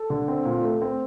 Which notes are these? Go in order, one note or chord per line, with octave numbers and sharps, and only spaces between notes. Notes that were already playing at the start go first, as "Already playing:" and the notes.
Already playing: A4
D3
C4
A#2
A3
C4